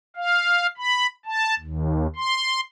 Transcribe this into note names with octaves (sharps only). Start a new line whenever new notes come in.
F5
B5
A5
D#2
C6